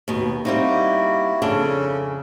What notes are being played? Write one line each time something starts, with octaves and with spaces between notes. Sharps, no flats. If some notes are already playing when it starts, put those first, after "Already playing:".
D#2 B2
G3 A#3 C4 D#4 E4 F#4
F2 C#3 C#4 D4 A4